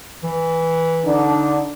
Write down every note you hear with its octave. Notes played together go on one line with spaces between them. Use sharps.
E3
D3 D4 D#4